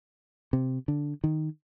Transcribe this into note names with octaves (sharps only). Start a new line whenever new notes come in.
C3
D3
D#3